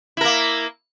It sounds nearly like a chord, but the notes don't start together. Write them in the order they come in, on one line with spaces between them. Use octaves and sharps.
E4 A#4 A#3